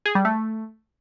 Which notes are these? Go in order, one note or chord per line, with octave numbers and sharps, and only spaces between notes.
G#4
G3
A3